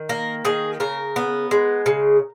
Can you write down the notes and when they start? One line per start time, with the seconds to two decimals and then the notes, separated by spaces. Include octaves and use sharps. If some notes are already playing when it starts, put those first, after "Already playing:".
Already playing: D#3
0.09 A#3 A#4
0.45 D#3 G#4
0.80 C#3 A#4
1.16 B3
1.51 G#3
1.86 C#3